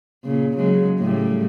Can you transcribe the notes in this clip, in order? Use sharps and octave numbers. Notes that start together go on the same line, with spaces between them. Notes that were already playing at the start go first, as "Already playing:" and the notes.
A#2 C#3
C#3 F#3 G#3
A2 C#3 G3